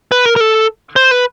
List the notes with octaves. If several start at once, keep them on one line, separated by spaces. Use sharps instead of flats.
B4
A#4
A#4
A4
C5
B4